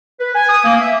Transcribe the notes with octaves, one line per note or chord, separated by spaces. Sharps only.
B4
G#5
D#6
A#3
E5